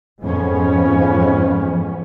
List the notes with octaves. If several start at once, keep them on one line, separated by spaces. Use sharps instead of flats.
F2 G#2 F3 B3 C#4